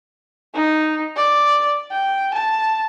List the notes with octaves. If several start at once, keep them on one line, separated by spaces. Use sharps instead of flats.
D#4
D5
G5
A5